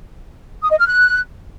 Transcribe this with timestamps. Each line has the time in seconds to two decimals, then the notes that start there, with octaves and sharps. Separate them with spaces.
0.62 D#6
0.70 D#5
0.78 F6
0.86 F#6